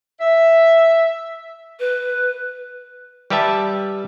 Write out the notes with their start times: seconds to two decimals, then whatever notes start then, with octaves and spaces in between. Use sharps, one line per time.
0.20 E5
1.80 B4
3.30 G3 G4 B4 E5 A5